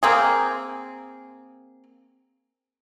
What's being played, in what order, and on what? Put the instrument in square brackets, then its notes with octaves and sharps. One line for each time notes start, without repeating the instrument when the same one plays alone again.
[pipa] A#3 C4 G#4